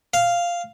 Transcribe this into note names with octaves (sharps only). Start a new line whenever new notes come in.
F5